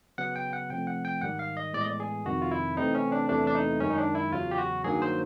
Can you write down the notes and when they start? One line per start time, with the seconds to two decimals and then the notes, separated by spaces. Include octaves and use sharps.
0.18 C#3 F#3 B3 F#5
0.36 G5
0.53 F#5
0.70 C3 F3 A3 C4 G5
0.87 F#5
1.05 G5
1.21 G#2 D#3 G3 F#5
1.39 F5
1.57 D#5
1.74 A2 E3 G#3 B3 D5
1.81 D#5
1.87 D5
2.00 G#4
2.26 F2 C3 D#3 G3 F#4
2.42 F4
2.51 E4
2.77 C3 E3 A3 C4 D#4
2.95 C#4
3.12 D4
3.29 E2 C3 E3 A3 D4
3.47 D4
3.55 D#4
3.80 F#2 D#3 G#3 C#4
3.90 D#4
3.98 D4
4.15 E4
4.33 E2 C#3 F#3 F4
4.51 G4
4.58 F#4
4.84 G2 D#3 F#3 A#3 G#4
5.02 C5